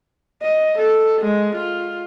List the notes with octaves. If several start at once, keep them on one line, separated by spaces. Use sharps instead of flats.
D#5
A4
G#3
F4